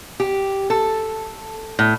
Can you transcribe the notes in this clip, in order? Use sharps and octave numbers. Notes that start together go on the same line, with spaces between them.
G4
A4
A2